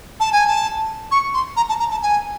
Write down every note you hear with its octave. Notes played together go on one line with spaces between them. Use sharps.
A5
G#5
A5
C#6
C6
A#5
A5
A#5
A5
G#5